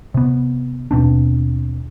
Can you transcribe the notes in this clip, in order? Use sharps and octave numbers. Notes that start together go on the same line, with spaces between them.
C3 B3
D#2 B2 C4 D4